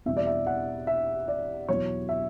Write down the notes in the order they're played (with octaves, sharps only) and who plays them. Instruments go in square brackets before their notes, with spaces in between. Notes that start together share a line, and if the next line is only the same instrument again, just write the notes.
[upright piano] E2 B2 G3 E5
D5
E5
F#5
E5
D5
E2 B2 F#3 C#5
E5